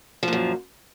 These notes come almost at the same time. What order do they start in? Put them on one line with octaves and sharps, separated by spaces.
F3 A#2 F#2